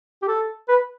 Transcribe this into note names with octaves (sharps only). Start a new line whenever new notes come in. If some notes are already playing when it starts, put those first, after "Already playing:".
G4
A4
B4